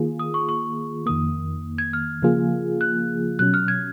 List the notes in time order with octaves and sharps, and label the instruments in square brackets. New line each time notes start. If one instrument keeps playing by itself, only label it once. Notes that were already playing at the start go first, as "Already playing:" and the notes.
Already playing: [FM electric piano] D#3 A#3 F4 G#4
[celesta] D#6
C#6
C#6
[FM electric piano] F2 D#3 A#3 [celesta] D#6
[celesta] G#6
F6
[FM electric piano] C#3 F3 A#3 F4 G#4
[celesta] F#6
[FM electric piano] B2 F#3 C#4 [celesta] F#6
[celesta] F6
G#6